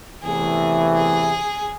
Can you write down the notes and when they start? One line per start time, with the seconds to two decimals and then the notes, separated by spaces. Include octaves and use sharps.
0.23 E2 C3 E3 A3 G#4
0.95 G#4